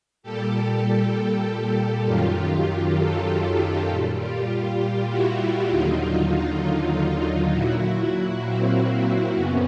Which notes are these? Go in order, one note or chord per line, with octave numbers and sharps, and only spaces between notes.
A#2 G3 G4 A4
F#2 D#3 F#3 F4 G4
G4 A4
A#2 G3
F4 G4
F4 G4
F4 G4
E4 F#4
E4 F#4
D#2 D3 F#3 D#4 F4
A#2 F#3 E4 F#4
A#3 C4
F#2 C#3 B3 C#4